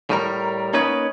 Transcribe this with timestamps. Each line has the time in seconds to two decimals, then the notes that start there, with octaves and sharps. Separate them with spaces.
0.10 A2 G3 A#4
0.74 A#3 C#4 D#4 B4 C#5 D#5